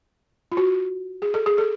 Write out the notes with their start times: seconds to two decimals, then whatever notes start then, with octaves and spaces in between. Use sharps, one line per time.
0.52 F4
0.57 F#4
1.22 G#4
1.34 A4
1.46 G#4
1.58 A4